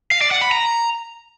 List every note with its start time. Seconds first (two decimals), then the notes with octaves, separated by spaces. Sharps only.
0.11 F5
0.21 D5
0.31 F#5
0.41 B5
0.51 A#5